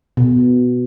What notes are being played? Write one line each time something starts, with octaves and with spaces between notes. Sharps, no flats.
B2